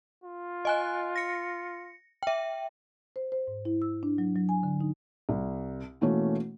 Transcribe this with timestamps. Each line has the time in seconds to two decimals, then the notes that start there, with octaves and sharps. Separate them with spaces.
0.24 F4
0.65 D#5 G#5 F#6
1.16 A#6 C#7
2.23 E5 G5
3.16 C5
3.32 C5
3.47 G#2
3.65 E4
3.82 E6
4.03 D4
4.18 F#3
4.36 F#3
4.49 G#5
4.63 D3
4.81 D#4
5.29 C2
6.01 B2 E3 A3 A#3 C#4